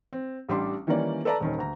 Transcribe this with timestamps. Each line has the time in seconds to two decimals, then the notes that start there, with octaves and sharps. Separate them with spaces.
0.13 C4
0.49 A1 G3 D4 C6 D6
0.87 D#3 E3 G3 A#3 C#4 D5
1.25 A4 B4 D5 A5 A#5
1.40 D#1 D#3 C#4
1.58 D2 A#5